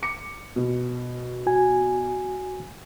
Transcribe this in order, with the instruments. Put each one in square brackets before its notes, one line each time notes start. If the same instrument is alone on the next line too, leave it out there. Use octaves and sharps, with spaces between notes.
[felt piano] D6 C#7
B2
[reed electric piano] F#4 G#5